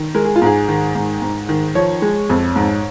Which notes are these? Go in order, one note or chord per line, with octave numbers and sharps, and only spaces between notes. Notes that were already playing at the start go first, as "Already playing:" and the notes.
Already playing: D#3
G#3 A#4
G#4
F4
G#2 G#4
D#3
G#2
G#2
D#3
F3 C#5
G#3
F2
G#2